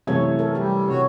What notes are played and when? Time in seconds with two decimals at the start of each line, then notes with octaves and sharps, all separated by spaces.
0.07 F#2 C3 E3 A3 C#5 G#6
0.39 A4 A#4
0.55 G3 G4
0.88 C3 F#4 C#5